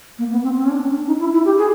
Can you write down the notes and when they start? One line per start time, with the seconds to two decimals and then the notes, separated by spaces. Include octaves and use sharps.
0.18 A#3
0.31 B3
0.43 C4
0.57 C4
0.65 C#4
0.70 D4
0.82 C#4
0.95 D4
1.07 D#4
1.20 E4
1.33 E4
1.45 G4
1.58 G#4